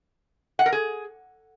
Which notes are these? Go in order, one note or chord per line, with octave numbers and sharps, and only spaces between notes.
F#5
A#4
G#4